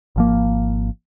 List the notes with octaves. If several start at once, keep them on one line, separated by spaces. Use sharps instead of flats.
G#1 F3 A#3